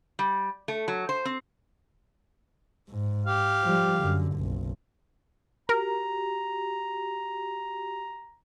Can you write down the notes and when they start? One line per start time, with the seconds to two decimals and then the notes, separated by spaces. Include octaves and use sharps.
0.19 G3
0.68 A3
0.88 F#3
1.09 C5
1.25 C4
2.90 G#2
3.26 G4 F5
3.63 F3 G3
3.99 F#2 D3
4.34 F#1 B1
5.69 F#4 G4 A#4 A#5